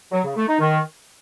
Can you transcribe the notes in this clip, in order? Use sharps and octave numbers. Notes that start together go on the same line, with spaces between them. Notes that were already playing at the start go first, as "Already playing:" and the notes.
F#3
C#3
A3
D#4
D#3